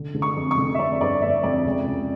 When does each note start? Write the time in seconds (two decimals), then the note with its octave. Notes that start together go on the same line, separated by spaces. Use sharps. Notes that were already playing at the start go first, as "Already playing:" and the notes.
Already playing: D3
0.15 D3
0.22 C#6
0.36 F2
0.51 C#6
0.58 D3
0.74 E5
0.79 F2 D5
1.01 G1 D5
1.22 G1 E5
1.43 F2 D5
1.65 C#2
1.87 C#2